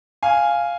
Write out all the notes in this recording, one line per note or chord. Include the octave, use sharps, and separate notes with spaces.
F5 G#5